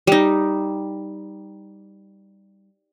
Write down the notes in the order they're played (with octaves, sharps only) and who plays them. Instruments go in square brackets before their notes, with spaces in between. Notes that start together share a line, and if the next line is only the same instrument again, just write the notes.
[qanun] G3 D#4